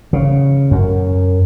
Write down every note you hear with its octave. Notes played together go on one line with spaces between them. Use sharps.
C#3
F#2